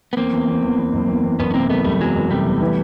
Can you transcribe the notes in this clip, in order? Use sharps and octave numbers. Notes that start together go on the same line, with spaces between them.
B3
E2 A#3 C4
E2
E2
E2
E2
F#1
E2
E2
F#1 B3 C#4
C#4
C3 A#3 C4
F#1 A3 B3
F#1 G3 A3
E2 F#3 G#3
F#1
C3 G3 A3
E2
E3